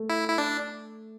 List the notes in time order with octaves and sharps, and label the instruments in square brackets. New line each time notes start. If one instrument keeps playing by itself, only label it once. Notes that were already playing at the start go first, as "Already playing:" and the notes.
Already playing: [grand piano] A3
[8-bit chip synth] E4
E4
D4